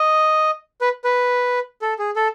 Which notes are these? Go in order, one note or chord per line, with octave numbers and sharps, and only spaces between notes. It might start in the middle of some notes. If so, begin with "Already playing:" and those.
Already playing: D#5
B4
B4
A4
G#4
A4